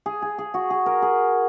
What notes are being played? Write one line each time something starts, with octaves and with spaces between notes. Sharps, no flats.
G#4
G#4
G#4
F#4
G#4
A#4
G#4